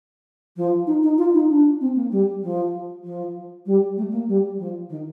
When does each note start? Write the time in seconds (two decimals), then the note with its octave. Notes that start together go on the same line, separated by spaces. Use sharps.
0.56 F3
0.87 D#4
1.03 D#4
1.18 F4
1.34 D#4
1.49 D4
1.81 C4
1.95 A#3
2.11 G3
2.42 F3
3.04 F3
3.66 G3
3.97 A3
4.12 A#3
4.27 G3
4.58 F3
4.89 D#3